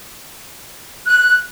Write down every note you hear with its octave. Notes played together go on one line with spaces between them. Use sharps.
F#6